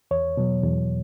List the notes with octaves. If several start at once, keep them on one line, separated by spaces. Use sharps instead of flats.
E2 C#5
B2 F#3
E2